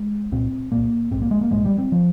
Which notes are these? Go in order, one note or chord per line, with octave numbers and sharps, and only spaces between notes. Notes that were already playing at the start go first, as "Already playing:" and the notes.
Already playing: G#3
C2 A#2 C4
C2 A#2 A#3
A#1 G#2 C4
A#3
G#3
A#3
A#1 G#2 G#3
G3
C4
F3